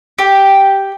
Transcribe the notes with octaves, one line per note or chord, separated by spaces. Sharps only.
G4